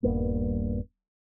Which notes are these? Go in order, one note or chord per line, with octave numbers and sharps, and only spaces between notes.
D#1 G2 A#3 B3